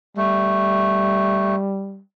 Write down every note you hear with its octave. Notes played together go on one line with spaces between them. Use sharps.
G3 A3